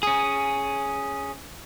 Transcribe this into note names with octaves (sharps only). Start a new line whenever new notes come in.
C#4 G#4